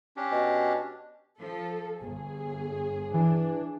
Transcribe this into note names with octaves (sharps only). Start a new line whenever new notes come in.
C#4 D4 G4
B2
F3 A4
G1 G#4
E3 D4